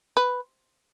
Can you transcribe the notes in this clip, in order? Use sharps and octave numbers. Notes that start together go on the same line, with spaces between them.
B4